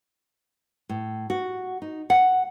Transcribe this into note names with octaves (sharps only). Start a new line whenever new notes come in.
A2
F#4
D#4
F#5